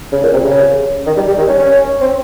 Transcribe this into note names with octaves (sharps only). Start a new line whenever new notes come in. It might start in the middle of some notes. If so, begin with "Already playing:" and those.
C#3
A#2
C3
C#3
D#3
G3
G3
D#3
C#4
C#4
C4